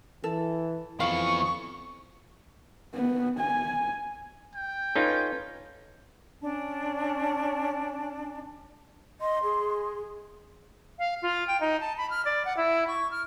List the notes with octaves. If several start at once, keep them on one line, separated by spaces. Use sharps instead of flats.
E3 A4
F2 E3 B3 F5 C#6
B3
G#5
G5
C#4 D#4 F4 A4 B4 G#6
C#4 D4 A5
D#5 C6
G#4
F5
F4
G5
D#4
A5
B5
F6
D5
F#5
E4
C#6
F6